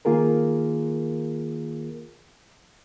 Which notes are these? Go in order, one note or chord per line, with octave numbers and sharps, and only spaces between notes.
D#3 A#3 F4 G#4 A#4